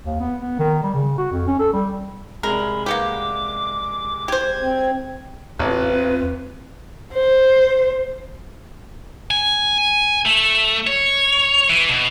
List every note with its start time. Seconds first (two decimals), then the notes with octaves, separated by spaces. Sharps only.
0.06 D#2
0.21 B3
0.41 B3
0.59 D#3
0.83 G3
0.94 C#3
1.18 F#4
1.32 F2
1.47 C#4
1.59 A4
1.73 G3
2.43 C2 G#3 A#4 B5
2.86 A#3 B3 G4 D6
4.28 G4 C5 G#6
4.61 C4
5.59 A1 E2 C4 F4 B4
7.13 C5
9.31 G#5
10.26 A3
10.87 C#5
11.70 E3
11.89 B2